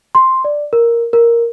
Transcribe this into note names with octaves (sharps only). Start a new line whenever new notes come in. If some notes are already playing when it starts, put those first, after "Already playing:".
C6
D5
A#4
A#4